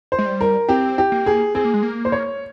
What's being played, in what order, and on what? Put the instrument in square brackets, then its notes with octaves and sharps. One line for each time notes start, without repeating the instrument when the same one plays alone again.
[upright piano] C5
[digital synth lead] G#3
G3
[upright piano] A#4
[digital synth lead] C4 [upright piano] G4
[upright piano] G4
[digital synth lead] A#3
[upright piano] G#4
[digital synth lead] C4 [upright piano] G#4
[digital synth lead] A#3
G#3
A#3
[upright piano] C5
C#5